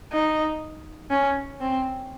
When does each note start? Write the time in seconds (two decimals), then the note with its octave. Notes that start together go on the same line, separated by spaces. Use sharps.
0.13 D#4
1.11 C#4
1.60 C4